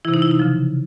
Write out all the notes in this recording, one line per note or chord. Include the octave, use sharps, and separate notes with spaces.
C3 E3 E4
D#4
E4
D#4
C#3 F3